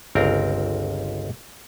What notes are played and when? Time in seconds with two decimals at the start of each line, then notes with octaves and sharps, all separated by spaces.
0.15 G1 C#2 C4 A#4 A#5